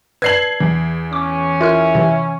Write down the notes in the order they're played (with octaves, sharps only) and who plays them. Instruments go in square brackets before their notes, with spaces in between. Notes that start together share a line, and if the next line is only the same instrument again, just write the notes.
[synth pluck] B4 D5 A5 [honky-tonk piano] G#6 C7 F#7
[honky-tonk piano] E2
[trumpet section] C#4 [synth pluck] D6
[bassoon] E4 [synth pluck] F4 A#4 F6
[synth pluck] C3 E3